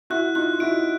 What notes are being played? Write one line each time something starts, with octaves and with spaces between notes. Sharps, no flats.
E4 F#4 F#6
D#4 F4 F#6
E4 F#4 D7